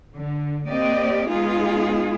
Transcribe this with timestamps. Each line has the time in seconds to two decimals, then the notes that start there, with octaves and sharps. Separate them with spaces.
0.14 D3
0.67 A#3 C4 G4 D5 D#5
1.29 G#3 B3 D#4 F4 G#4